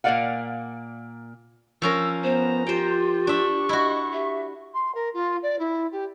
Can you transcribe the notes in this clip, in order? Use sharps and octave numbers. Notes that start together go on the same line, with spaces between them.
A#2 A#3 B4 D5 F5 F#5
F3 C#4 A#4 E6
B3 C5 A#5
F4 G4 C5 G5
D4 E5 C#6
E4 F#4 D#5
G4 E5
C6
A#4
F4
D5
E4
G4